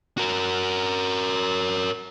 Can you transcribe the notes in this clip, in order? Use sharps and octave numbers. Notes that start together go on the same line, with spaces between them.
F#4 A#4